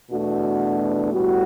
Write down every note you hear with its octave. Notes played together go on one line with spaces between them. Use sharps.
E2 B2 A3 D4 F#4
A2 G3 B3 F#4